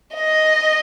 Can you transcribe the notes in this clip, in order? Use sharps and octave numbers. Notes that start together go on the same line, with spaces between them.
D#5